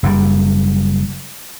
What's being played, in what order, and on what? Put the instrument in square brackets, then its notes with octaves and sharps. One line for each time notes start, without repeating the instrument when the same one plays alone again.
[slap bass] F#1 F#2 A#2 G3